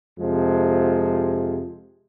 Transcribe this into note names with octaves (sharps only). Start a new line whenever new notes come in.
F2 C3 F3 G#3